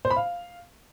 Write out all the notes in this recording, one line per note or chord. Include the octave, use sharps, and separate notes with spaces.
C5
B5
F5